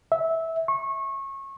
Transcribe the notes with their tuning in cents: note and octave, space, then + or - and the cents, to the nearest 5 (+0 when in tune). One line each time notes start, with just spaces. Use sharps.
E5 -15
C#6 -25